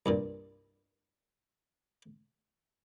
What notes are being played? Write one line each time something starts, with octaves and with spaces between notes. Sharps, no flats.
C2 G2 A#2